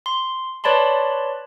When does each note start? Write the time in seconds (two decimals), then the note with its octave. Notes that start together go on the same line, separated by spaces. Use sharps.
0.06 C6
0.64 B4 C#5 D5 A5 B5 C6